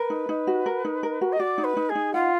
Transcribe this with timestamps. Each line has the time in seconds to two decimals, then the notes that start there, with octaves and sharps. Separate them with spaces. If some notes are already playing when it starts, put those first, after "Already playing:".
Already playing: A#4 B4
0.10 D#4
0.29 D#4
0.47 F#4
0.66 A#4
0.85 D#4
1.03 A#4
1.21 F#4
1.32 D#5
1.39 F#4 D5
1.58 D#4
1.64 B4
1.77 D#4
1.89 G#4
1.95 D#4
2.13 F4 F#5